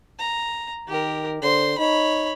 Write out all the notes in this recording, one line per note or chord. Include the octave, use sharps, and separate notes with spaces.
A#5
D#3 G4 A#4
D3 C5 C6
D#4 C#5 B5